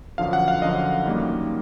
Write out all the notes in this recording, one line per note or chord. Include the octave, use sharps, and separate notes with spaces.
F#2 D3 F3 F5
F#5
F5
F#2 D3 F3 D#5
F#2 D#3 G3 A#3